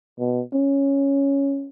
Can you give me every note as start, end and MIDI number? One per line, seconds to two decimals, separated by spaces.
0.19 0.41 47
0.53 1.69 61